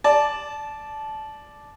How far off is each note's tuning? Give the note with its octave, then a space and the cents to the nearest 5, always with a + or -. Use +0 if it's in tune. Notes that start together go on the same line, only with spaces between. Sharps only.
D5 +0 A5 -20